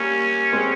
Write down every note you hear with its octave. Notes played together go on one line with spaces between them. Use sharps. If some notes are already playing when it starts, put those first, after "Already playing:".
Already playing: G3 A#3 C#4
G#3 C4